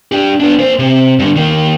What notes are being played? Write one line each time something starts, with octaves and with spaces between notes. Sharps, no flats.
D4 G4
B3 D4
A#3 C5
C3
G2 D3
D#3 A#3